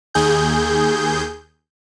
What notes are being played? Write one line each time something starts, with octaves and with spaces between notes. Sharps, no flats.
D#2 G#4 G6